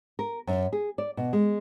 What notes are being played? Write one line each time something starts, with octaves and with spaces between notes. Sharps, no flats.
A#4
F#2
G#4
D5
B2
G#3